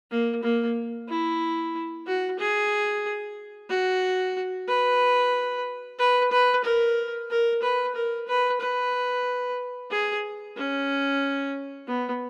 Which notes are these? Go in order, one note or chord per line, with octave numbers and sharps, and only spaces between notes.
A#3
A#3
E4
F#4
G#4
F#4
B4
B4
B4
A#4
A#4
B4
A#4
B4
B4
G#4
C#4
B3